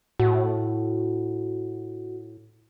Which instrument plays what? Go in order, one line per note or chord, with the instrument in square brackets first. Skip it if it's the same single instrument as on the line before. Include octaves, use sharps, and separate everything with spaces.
[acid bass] A2 [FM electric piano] F#4